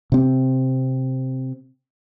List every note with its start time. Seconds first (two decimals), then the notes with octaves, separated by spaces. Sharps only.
0.12 C3 C4